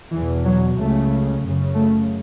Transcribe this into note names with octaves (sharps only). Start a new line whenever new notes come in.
E2 B2 E3
F#3
C#2 C#3 A3
F#2 C#3
A3